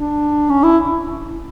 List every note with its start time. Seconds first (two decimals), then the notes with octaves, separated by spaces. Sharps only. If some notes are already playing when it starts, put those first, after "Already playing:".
Already playing: D4
0.49 C#4
0.64 E4